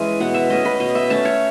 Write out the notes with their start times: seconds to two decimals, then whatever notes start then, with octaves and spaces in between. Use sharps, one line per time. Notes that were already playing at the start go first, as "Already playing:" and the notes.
Already playing: E3 G#3 C#4 E5 G#5
0.20 B2 F#5
0.34 E5
0.50 A3 C#4 D#5
0.65 B4
0.80 B2 D#5
0.95 E5
1.10 A3 C#4 A5
1.25 C#5